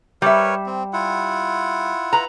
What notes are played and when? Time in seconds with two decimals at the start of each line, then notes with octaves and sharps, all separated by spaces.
0.22 G3 A#4 B4 C#5 E5
0.66 C4
0.93 E4 F4 F#5
2.13 B4 A#5